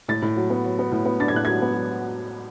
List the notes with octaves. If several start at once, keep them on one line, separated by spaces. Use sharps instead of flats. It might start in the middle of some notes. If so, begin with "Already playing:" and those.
A2 A6
A2
F#3
B3
F#3
B3
A2
B3
D4 A6
G#6
A2 F#6
F#3 G#6
B3
F#3